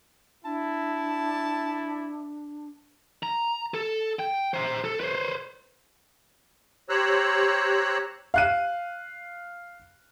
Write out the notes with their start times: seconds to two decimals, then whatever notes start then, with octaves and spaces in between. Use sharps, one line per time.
0.45 D4 E4 A5
3.23 A#5
3.74 A4
4.19 G5
4.54 C5 A#5
4.84 A4
5.00 B4 C5
6.89 G4 C5 C#5 A#5 E6 F#6
8.34 F5 F#6 D#7